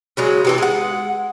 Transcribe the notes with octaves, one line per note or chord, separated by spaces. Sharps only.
C#3 F#3 G#3
C3 E3 A4
G#3 F#5